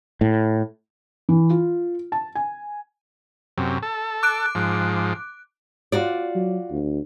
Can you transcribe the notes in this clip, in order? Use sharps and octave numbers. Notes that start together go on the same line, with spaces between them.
A2
E3
F4
A5
G#5
F#2 C3
A4
D6 F#6 D7
G#2 F3
F4 F#4 D5
F#3
D2